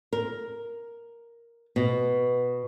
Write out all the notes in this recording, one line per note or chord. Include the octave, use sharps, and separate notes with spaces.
A#4
B2